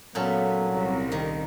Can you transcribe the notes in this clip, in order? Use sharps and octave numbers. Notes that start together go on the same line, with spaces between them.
A#2 F#3 B3 C#4 A4
C2
D#3